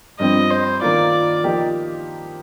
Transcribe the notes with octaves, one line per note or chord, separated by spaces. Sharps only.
G2 F3 C4 D#5
C5
D#3 A#3 F4 D5
F3 A#3 D#4 G4